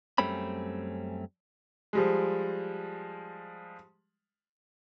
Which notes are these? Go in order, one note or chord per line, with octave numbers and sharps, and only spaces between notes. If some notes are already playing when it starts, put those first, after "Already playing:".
F#2 G3 A3 C4 C#4 B5
F3 G3 G#3